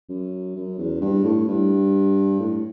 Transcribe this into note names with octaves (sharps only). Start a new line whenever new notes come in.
F#2
F#2
E2
G2
A2
G2
A2